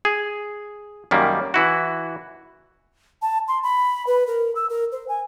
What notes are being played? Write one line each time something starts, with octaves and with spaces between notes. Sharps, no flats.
G#4
F#2 D#3 G3 A#3
E3 E4 F#4
A5
C6
B5
B4
A#4
E6
A#4
C5
G#5